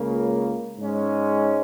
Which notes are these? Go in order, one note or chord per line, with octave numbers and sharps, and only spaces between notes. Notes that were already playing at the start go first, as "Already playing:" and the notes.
Already playing: C#2 C#3 A#3
G#2 G#3 C#4